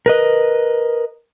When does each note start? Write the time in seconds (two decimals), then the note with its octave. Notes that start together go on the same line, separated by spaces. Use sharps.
0.06 A#4 B4 D#5